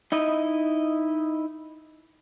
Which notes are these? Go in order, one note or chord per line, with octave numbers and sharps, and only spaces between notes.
D#4 E4 D#5